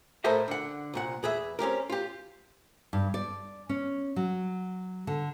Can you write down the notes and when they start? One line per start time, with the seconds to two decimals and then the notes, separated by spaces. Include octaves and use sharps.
0.24 A2 A4 A#4 C5 D#5 E5
0.48 D3 F#5
0.94 C2 A#2 F#5
1.23 E2 G#4 B4 E5
1.59 C4 C#4 G4 A#4
1.90 F4 G4
2.93 G2
3.14 D5
3.69 C#4
4.16 F#3
5.07 D3